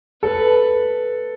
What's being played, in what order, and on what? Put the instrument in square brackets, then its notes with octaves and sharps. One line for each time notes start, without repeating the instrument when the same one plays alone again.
[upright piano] A4 [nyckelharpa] B4